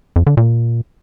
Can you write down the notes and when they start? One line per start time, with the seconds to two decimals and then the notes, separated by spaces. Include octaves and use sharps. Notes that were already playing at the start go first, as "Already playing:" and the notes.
0.16 F2
0.27 D3
0.37 A#2